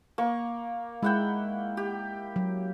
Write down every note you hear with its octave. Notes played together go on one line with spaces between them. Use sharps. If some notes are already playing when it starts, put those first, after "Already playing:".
A#3 C#6
G#3 E4 F#5 G5
G4
F#3